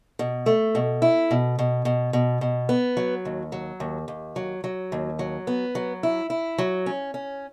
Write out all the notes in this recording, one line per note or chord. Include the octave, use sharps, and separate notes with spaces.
B2
A3
B2
E4
B2
B2
B2
B2
B2
B3
F#3
D#2
F#3
D#2
D#2
F#3
F#3
D#2
F#3
B3
F#3
E4
E4
F#3
C#4
C#4